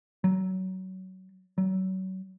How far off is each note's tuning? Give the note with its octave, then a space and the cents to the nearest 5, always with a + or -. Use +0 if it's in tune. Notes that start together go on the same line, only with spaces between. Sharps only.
F#3 +20
F#3 +30